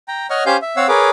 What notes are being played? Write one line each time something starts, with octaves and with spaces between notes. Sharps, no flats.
G5 A#5
C#5 D#5 F#5 C#6 F6
C#4 G4 C5 F5 G#5 G6
E5
C4 C#5 F5 F#5 E6
G#4 A#4 B4 C#5 D6